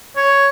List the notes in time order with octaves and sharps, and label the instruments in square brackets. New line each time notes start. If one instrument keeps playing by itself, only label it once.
[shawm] C#5